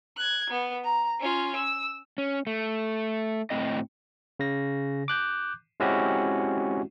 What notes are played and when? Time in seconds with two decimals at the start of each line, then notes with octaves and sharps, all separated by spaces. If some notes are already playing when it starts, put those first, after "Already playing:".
0.17 F#6 G#6
0.50 B3
0.84 A#5
1.20 C#4 F4
1.56 E6
2.18 C#4
2.47 A3
3.50 A2 C4 D#5
4.40 C#3 A#6
5.08 D6 F#6 G6
5.80 G#3 C4 C#4 E4 F#4 G4